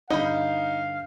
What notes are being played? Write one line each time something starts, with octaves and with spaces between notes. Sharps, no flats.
G2 D3 D#4 D#5 F5 B5 G6